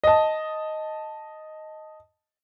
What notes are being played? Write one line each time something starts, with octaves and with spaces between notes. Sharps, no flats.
D#5 A5